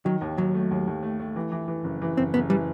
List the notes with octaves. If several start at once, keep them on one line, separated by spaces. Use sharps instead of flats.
D#3 F#3
D#2
D#2 F#3
A3
D#2
D#2
A3
A3
E3
E3
E3
F#1
E3
F#1 C4
F#1 B3
E3 G3